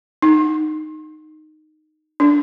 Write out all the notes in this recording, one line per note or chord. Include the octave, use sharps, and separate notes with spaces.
D#4
D4